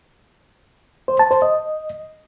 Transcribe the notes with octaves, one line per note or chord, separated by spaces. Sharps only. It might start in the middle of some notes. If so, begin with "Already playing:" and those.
C5
A5
C5
D#5